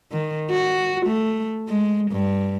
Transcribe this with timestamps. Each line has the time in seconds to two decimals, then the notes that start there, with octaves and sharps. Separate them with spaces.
0.12 D#3
0.51 F#4
1.06 A3
1.69 G#3
2.12 G2